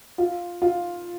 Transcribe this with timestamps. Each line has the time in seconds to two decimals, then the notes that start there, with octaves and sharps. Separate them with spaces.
0.18 F4
0.62 F4